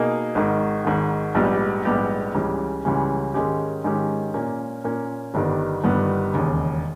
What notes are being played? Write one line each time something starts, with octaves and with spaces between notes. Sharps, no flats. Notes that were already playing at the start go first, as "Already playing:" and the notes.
Already playing: B2 A#3 D#4 G#4
G#1 G#2 D#3
G#1 G#2 D#3
A#1 G#2 G3 B3 G4
A#1 G#2 G3 B3 G4
C#2 C#3 E3 G3 C#4
C#2 C#3 E3 G3 C#4
G#2 D#3 G#3 C#4 G4
G#2 D#3 G#3 C#4 G4
A#2 A#3 C#4
A#2 A#3 C#4
G1 G2 D#3 G3 B3
G1 G2 D#3 G3 B3
E1 D#2 C#3